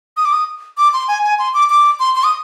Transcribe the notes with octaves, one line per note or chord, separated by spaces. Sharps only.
D#6
D6
D#6
D6
C6
G#5
G#5
C6
D6
D6
C6
C6
D#6